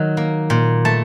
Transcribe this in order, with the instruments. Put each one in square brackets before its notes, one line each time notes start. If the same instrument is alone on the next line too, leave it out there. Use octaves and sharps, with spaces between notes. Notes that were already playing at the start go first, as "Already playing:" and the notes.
Already playing: [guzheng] D#3 F#3
A#3
A#2
A3 A5